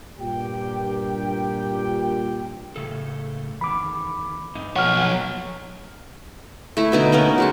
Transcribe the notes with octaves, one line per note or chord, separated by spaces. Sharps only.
G2 A#2 G4 G5
A2 C#3 A4
E2 D#3 B5 D6
G2 D#4
B1 F3 F#3 A#3 C#5 F#5 F6
A3 E4
B2 D3 D#4
A#3 B3 C#4 A#4
F#3 G#3 A5